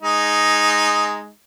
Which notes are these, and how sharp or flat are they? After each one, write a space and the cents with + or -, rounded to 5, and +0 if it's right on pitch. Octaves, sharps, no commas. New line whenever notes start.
G#3 +0 D#4 +0